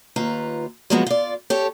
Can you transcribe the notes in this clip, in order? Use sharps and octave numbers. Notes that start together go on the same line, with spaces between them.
D#2 F4 B4 A#5
F3 F#3 G#3 A#3 B3 F#4
F4 D5
G4 A4 C#5